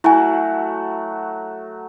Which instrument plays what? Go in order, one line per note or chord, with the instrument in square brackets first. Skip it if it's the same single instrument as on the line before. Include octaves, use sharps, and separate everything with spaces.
[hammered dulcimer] F#3 A3 F#4 [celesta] E4 G#5